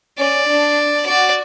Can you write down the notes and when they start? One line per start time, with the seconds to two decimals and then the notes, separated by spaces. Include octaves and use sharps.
0.19 C#4 D5
0.47 D4
1.05 F#4 D5